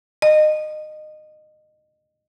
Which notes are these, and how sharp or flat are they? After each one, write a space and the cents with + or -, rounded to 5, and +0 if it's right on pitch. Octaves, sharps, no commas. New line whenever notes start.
D#5 -25